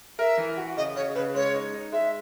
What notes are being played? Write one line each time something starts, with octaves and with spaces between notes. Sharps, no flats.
A#4 E5
E3
F#4
C#3 D#5
C#3 C#5
C#3 B4
G#3 C#5
D#4
D#4
G#3 E5